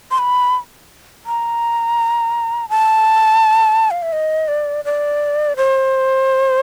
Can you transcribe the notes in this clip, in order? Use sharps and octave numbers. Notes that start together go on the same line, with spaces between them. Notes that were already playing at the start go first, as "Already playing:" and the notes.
C6
B5
A#5
A5
F5
E5
D#5
D5
D5
C5